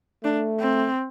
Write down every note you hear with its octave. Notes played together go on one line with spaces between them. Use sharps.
A3 D4
C4